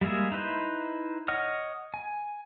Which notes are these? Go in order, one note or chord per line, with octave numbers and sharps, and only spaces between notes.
G3 G#3 A#3 G#4 E5
D#4 E4 B4 C5
C#5 D#5 F#5 D#6 F6
G#5